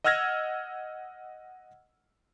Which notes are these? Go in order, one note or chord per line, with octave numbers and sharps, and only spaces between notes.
D#5 F#5 E6 F6 G#6 A#6